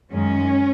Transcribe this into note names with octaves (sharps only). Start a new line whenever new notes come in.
F#2 D#3 G#3 C#4